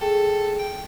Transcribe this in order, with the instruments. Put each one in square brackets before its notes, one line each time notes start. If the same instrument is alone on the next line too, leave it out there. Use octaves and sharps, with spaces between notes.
[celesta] G#4 G5 [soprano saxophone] A4
[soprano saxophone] G5